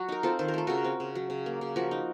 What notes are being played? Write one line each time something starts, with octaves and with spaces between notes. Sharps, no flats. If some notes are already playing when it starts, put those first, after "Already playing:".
Already playing: F#3 F#4
D#4 A#4
C4 F4 A4
D#3 C5
A#4
A3 A4
C#3 F#4 A#4
C4
C#3
F#3
C#3
A#3
C#3
F3 F#4 A#4
D#4